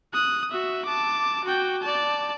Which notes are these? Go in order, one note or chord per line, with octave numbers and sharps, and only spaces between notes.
D#6 F#6
F#4 E5
A5 D6
F#4 G5
D5 A5